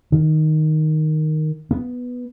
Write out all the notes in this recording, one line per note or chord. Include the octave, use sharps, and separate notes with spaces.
D#3
B3